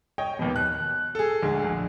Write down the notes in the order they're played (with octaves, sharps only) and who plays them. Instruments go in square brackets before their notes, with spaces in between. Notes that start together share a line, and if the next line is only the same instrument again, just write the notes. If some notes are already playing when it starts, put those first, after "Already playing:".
[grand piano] C#5 D#5 G5
D#2 B2
F#6
G#4 A4
D2 G#3 G#4
A#1